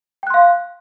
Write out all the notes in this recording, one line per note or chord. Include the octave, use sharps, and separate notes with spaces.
F5 G5 C6 F#6